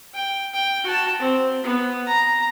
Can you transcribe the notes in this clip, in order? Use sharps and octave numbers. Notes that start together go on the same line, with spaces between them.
G5
G5
F#4 A5
C4
B3
A#5